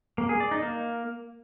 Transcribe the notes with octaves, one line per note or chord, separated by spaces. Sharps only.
A#3
G#4
D5
D#4
A#3